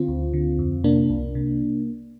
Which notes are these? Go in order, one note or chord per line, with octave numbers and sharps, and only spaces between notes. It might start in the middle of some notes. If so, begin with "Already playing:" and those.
Already playing: D3 C4 F4
D2
D3
F2
C3 A#3 D4
C2
C3